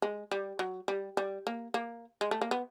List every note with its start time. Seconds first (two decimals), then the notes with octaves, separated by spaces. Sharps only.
0.02 G#3
0.32 G3
0.59 F#3
0.88 G3
1.17 G3
1.47 A#3
1.74 A#3
2.21 G#3
2.31 A3
2.41 A#3
2.51 B3